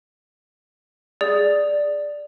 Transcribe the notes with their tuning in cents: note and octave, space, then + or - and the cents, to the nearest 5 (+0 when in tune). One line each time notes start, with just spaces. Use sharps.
G#4 +0 D5 +0